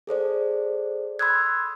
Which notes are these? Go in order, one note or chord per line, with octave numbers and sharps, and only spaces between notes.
G#4 A4 C5 D5
B5 C6 D#6 E6 F#6 G#6